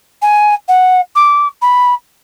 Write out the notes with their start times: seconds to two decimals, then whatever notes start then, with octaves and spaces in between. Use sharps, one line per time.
0.22 G#5
0.68 F#5
1.15 D6
1.62 B5